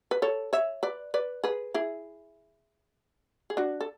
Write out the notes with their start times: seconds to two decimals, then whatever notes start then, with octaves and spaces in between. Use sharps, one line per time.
0.11 B4
0.22 A4 C#5
0.53 C#5 E5
0.83 B4 D5
1.14 B4 D5
1.44 G#4 B4
1.74 E4 G#4
3.50 G#4
3.57 D4 F#4
3.81 A4